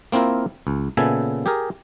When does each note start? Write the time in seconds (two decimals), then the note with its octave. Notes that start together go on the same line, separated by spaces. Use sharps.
0.12 A#3 C4 E4 F4 A#4
0.67 C#2
0.97 A#2 C#3 B3 A4 E5 G#5
1.46 G4 G#4 A#4